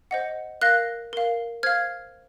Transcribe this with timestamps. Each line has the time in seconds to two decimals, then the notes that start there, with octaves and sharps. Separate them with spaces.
0.11 C5 D#5 F#5
0.62 A#4 F5 F#6 A#6
1.13 A#4 F5
1.63 C5 F5 F6 G#6